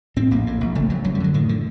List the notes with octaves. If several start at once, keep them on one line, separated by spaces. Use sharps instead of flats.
A2 C4
A#1 A#3
A2
A#1
F#1 A3
F#1 F#3
F#2 F#3
G3
D3 F#3
A2 D#3
D3